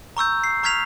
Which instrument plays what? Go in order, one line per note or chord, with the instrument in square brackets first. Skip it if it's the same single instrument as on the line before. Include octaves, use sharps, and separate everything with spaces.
[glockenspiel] A#5 C#6 E6 G6
C7
A#5 C#6 F6 G#6 B6 F7